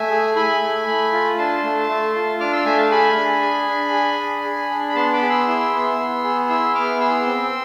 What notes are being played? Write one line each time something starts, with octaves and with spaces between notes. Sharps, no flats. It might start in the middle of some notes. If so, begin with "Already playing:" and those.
Already playing: A3 E5 G#5
G#4
E4 G#5 B5
A3
A3
F4
D4 A5 C6
A3
A3
F4
D4 D6 F6
C6 E6
A3 E5 G#5
F5 A5
G#4 G#5 B5
D4
G#4
D4
G#4
D4
G#4
D4
B5
B3 A5 C6
B5 D6
G#4
C6 E6
E4
B3
B3
G#4
E4 C6 E6
B3 D6 F6
G#4 C6 E6
C4